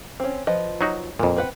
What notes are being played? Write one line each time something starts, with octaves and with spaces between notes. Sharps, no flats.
C4 C#4
F3 B4 D#5
F#3 D#4 F#4
F2 A#2 A#3
C4 B4 F#5